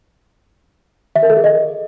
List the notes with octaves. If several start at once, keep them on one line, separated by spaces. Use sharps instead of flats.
E5
A#4
A4
G#4
D#5